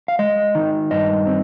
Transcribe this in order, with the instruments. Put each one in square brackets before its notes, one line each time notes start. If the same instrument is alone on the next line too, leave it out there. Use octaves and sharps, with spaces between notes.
[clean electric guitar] F5
G#3 D#5
D#3
G2 D#5
C4